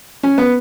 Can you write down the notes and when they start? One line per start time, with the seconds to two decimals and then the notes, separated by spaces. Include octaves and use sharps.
0.23 C#4
0.38 B3